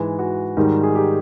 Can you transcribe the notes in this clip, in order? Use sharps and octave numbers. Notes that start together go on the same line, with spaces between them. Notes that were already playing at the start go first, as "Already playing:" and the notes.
Already playing: G#2 E3 G#3
F#4
G#2 D#3 G3
G#4
G4